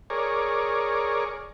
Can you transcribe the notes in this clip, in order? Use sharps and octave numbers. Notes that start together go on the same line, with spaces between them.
G#4 A#4 C#5 D5